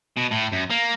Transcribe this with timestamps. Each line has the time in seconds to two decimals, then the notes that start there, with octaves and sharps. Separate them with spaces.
0.17 B2
0.31 A2
0.53 F#2
0.70 A#3